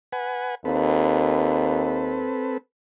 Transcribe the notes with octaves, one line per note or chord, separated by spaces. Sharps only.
B4 F#5 G#5
D#2 C4 A4 B4